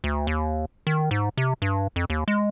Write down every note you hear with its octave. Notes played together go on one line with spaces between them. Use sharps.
D2
D#2
D#3
G#2
C3
G2
F2
D#2
G#3